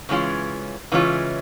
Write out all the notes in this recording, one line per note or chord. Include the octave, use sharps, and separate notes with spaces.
C#3 E3 G#3 C#4 F4
C#3 E3 G#3 C#4 F4